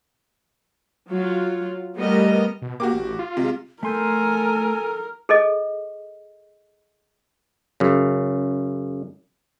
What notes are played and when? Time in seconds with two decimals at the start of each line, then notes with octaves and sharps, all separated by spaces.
1.11 F#3 F4
1.98 G3 A3 B3 A#4 D#5
2.62 B2
2.80 A#3 F#4 G4 D6
2.93 A1
3.19 F4
3.37 C3 G#3
3.83 A3 A4 A#4 G#5 C6 G6
5.29 G#4 A4 D#5
7.80 F#2 C#3